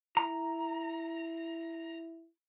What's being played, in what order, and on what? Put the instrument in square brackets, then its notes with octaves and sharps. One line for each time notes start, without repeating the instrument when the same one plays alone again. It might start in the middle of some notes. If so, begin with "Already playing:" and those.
[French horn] E4 [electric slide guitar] A#5